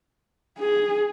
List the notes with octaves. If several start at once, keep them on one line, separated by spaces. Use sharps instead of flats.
G#4